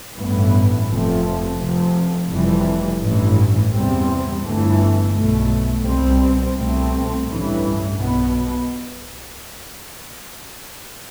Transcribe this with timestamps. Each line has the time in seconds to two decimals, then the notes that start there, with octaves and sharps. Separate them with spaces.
0.17 A1 G2 E3 B3
0.87 F1 F2 C3 F3 A3
1.58 F1 F2 C3 F3
2.29 F1 F2 C3 E3 G3
2.99 A1 G2 E3
3.71 E2 C3 G3 C4
4.42 G1 G2 E3 A3
5.12 B1 B2 A3
5.83 C2 B2 G3 C4
6.54 C2 B2 A3 C4
7.24 A1 G2 E3
7.96 B1 B2 B3